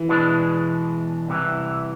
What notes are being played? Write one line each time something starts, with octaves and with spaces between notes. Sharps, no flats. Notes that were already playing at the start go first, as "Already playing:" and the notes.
Already playing: E3
E2 B2 G#3 D4
C2 C3 E3